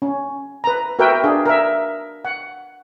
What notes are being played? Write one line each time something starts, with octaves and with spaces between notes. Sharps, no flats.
C#4
B4 A#5
F#4 A#4 B4 E5 G5
D4 G#4 F5
A#4 E5
F#5